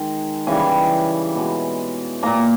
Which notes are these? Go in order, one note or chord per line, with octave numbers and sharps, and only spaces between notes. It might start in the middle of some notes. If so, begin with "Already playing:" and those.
Already playing: D#3 G#3
C#3 E3 G3 G#5
B2 G#3
A#2 A#3 A#5